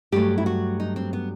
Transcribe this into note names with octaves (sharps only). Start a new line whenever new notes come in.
G2 F#3 A3 G4
E4
F#4
D#4
C4
B3